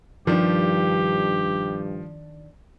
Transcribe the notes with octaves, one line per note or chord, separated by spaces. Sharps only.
G2 D#3 F3 D4 G4